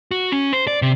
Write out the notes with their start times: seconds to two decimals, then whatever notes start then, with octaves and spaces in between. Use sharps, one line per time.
0.11 F#4
0.32 C#4
0.53 C5
0.67 D5
0.82 C3